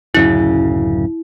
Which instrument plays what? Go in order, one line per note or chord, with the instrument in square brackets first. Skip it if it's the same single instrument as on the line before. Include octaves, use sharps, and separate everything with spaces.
[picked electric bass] D1 F#2 C#3 [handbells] E4